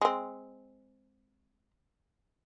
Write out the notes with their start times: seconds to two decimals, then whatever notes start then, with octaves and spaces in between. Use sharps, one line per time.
0.01 G#3 C4